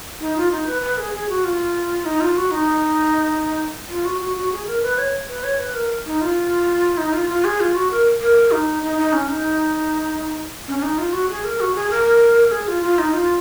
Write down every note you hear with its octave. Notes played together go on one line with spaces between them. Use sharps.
D#4
F4
D#4
B4
B4
G#4
G#4
F#4
F4
D#4
F4
F#4
D#4
F4
F#4
F#4
F#4
G#4
A#4
B4
C#5
B4
C#5
B4
A#4
D#4
F4
D#4
F4
F4
G#4
F4
F#4
A#4
A#4
D#4
D#4
D#4
C#4
D#4
C#4
C#4
D#4
F4
F#4
G#4
A#4
F#4
G#4
A#4
G#4
F4
F4
D#4
F4